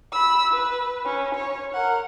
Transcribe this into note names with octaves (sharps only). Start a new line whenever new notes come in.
B5 E6
B4
C#4
C#5
A#4 F#5